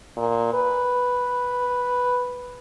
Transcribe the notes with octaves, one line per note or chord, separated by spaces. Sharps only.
A#2
B4